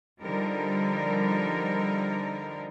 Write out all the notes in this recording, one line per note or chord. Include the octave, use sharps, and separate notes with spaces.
D3 F3 G3 D#4 A#4